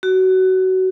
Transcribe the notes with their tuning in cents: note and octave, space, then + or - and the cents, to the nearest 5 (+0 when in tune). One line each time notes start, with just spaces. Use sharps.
F#4 +20